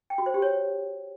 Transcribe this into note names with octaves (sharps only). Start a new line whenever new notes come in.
G5
F#4
C5
G4
C#5